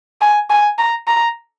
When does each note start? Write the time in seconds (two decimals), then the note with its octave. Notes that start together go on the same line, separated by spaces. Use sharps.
0.21 G#5
0.50 G#5
0.78 A#5
1.08 A#5